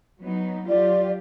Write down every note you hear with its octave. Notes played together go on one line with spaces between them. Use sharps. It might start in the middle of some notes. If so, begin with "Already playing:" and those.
F#3 B3 D#4
F#3 F4 G4 D5